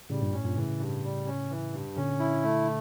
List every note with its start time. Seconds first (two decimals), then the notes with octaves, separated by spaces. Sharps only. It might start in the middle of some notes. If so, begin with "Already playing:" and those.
0.10 A2 C#3 G3
0.21 G2 A#2
0.32 A2 C#4
0.44 G2 A#2
0.56 A2 C#3 E3
0.79 G2
1.03 G3
1.26 C#4
1.50 E3
1.72 G2
1.96 A#2 D3 C#4
2.19 E4
2.44 A3